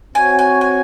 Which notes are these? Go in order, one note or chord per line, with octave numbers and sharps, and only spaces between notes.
C4 F#4 C#5 G#5
G#5
G#5